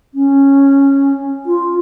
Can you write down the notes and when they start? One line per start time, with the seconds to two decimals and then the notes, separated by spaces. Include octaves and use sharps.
0.14 C#4
1.46 F4